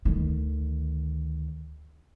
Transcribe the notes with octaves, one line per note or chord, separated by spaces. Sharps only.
D2 D#3